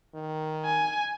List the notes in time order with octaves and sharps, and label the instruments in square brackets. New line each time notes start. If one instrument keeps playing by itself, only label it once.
[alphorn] D#3
[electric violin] G#5